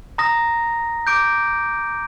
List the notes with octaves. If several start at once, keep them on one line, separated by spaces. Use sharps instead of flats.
A#5 D#6 A#6
D6 G6 D7